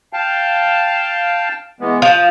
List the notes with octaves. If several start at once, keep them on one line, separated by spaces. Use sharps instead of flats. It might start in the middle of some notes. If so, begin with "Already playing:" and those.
F5 G5 A5
E3 G#3 B3
F3 D#6